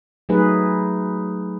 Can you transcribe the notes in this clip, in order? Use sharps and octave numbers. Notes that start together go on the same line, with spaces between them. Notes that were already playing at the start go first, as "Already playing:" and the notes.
F#3 A3 D#4 G#4 B4